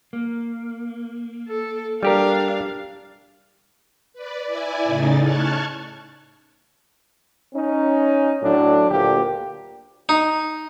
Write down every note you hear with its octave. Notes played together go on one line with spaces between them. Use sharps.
A#3
A4
G3 D4 G4 A#4 F5
B4 D5
E4 D5 G#5
A2 C#3 D#4 A6
A5 C#6 F6 F#6 G#6
C#4 D#4
A2 F#3 D4
D2 A#2 A#3 G4
D#4